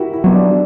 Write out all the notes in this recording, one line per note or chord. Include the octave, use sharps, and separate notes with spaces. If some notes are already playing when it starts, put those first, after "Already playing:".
Already playing: E4 F#4 G4 A#4
E4
F#3 B3
D4